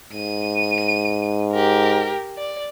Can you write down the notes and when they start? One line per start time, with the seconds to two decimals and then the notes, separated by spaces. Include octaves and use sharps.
0.13 G#2 D#7
1.52 G4 A#4
2.37 D5